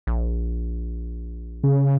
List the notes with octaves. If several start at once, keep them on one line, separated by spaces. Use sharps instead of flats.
A#1
C#3